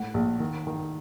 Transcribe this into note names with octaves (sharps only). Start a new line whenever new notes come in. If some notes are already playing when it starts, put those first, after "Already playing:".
Already playing: A2 F#5
A#1
D#3
D#3